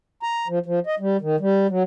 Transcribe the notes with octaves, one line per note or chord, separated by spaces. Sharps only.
A#5
F3
F3
D#5
G3
D#3
G3
F#3